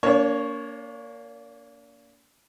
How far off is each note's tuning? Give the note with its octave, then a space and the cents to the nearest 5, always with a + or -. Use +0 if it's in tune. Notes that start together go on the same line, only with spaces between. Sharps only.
A#3 +0 D4 -40 C#5 +0